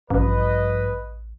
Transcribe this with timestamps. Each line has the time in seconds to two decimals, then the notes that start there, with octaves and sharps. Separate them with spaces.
0.10 A1 G2 F3 B4 D#5